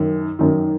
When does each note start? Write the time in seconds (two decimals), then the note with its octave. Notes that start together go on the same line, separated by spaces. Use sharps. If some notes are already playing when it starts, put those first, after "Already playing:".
Already playing: F#2 D#3
0.39 F#2 D#3